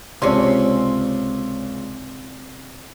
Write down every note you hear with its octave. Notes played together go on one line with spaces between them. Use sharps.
C#2 C3 C#4 D5 C6